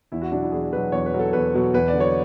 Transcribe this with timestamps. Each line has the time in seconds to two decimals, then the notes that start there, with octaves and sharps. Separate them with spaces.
0.12 E2 E4
0.21 F#4
0.32 B2 F#3 D4
0.43 E4
0.52 E2 G#4
0.72 B2 F#3 B4
0.92 E2 C#5
1.06 B4
1.14 B2 F#3
1.19 A4
1.33 E2 B4
1.54 B2 F#3
1.74 E2 B4
1.88 D5
1.94 D3
1.99 F#3 C#5